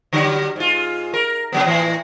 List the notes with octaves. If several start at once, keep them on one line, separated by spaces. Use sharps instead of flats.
D3 F#3 G3
G#2 F4
A#4
C#3 F#3 B3
A2 E3